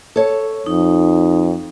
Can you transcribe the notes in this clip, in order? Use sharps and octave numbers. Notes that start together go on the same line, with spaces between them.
A4 C#5
F2 D#4